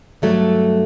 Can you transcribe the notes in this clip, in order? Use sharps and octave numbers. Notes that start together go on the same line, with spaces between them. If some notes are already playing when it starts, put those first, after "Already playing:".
G2 F#3 A3 A4